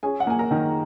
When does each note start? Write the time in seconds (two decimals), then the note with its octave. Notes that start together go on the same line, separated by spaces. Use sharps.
0.03 C#4 G#4 G#5
0.20 F#5
0.27 A#3 G#5
0.39 A#4 A#5
0.51 D#3